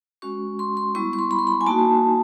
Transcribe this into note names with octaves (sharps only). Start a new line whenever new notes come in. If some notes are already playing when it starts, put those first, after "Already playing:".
G#3 C#4 F#4 C#6
C6
C6
G3 B3 E4 C#6
C#6
C6
B5
C6
B5
G#5
A#3 D#4 F#4 A5